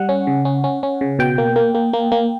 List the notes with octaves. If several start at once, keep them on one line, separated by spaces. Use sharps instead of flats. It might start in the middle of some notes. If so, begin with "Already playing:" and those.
Already playing: G3 F#5
C#4
C#3
C#4
C#4
C#4
C#3
B2 G5
A#3
A#3
A#3
A#3
A#3